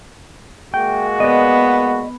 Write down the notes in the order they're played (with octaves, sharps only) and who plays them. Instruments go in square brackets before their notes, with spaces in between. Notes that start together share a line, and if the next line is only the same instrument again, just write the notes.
[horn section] G#3 A#3 F#4 [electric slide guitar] G5
[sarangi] B3 [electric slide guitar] B4 D5 D#5